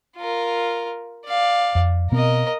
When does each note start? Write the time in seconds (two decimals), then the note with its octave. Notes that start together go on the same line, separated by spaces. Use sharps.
0.17 F4 A#4
1.26 D5 F5
1.75 F2
2.12 B2 B3 C4 A#4 D#5